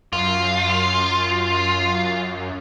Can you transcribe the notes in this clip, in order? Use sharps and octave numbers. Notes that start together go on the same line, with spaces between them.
F#2 F4